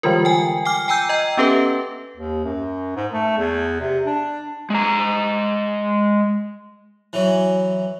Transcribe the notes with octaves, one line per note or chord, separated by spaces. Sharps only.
D3 E3 G3 G#3 F4 A#4
G5 G#5
G5 G#5 D6 F6
G5 G#5 A#5 E6 G6
D#5 G5 A#5
B3 C#4 G4 A4 B4 E5
D#2
F#2
G#2
A3
E2
C3
D4
G#3 A#5
E3 F#3